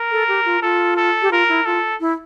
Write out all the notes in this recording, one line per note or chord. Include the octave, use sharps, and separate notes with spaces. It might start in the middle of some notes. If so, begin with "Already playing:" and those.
Already playing: A#4
A4
G4
F4
F4 A4
A4
G4
F4 A#4
E4
F4 A4
E4